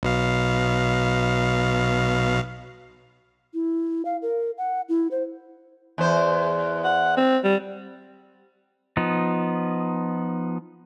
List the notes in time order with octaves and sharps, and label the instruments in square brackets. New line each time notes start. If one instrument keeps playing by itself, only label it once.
[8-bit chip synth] B1 B2 F5
[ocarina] E4
F5
A#4
F#5
E4
C5
[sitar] E2 C5
[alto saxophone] F#5
C4
G3
[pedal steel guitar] F3 B3 D#4